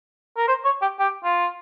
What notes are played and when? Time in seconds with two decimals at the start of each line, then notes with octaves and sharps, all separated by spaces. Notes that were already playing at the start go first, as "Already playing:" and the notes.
0.37 A#4
0.48 C5
0.65 C#5
0.82 G4
1.00 G4
1.24 F4